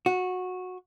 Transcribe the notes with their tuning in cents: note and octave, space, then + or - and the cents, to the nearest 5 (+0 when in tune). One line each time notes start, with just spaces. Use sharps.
F#4 -15